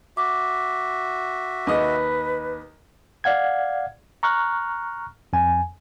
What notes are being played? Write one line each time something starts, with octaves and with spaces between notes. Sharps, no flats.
F#4 E5 D6
D#2 B4 D#5
D5 F5 F#5 G#6
A#5 C#6 F6 F#6
F2 G#5